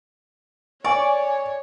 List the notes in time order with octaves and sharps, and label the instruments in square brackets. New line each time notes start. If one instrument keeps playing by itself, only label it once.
[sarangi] C#5 [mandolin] D5 [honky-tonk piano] G#5 C#6